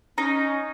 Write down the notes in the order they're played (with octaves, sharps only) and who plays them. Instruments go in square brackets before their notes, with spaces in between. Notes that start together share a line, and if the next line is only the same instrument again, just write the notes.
[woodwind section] C#4 [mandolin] D#4